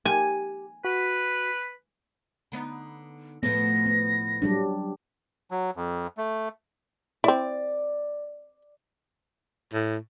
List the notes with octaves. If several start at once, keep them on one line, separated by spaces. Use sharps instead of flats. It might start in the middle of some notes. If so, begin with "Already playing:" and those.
G4 G#5
F#4 B4
D3 B3 D#4
A2 F3 A3 B3 A#6
B3
F#3 G3 D4
F#3
F2
A3
C4 E4 D5
A2